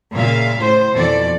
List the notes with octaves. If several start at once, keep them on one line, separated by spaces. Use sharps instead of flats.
A#2 C#3 E5 F5
A2 C5
F2 B2 E3 A4 D5